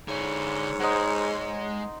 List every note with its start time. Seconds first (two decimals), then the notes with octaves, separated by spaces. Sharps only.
0.08 G#2 D3 C#5 G#5
0.80 G#3 D#4 C5 F#5